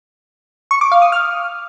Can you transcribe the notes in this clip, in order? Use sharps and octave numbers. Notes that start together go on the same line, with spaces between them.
C#6
D6
F5
D#6
F6